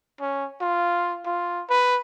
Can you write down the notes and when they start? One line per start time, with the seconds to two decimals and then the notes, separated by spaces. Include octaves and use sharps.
0.21 C#4
0.61 F4
1.26 F4
1.70 B4